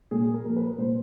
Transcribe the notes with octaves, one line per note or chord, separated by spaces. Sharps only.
A#2 G#4
A#4
F3 A#3
B4
A#2 C5